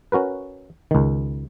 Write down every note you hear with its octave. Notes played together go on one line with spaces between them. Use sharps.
C#4 F#4 A#4 B4
C#2 D#3